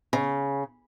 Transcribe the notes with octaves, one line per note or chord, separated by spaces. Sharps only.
C#3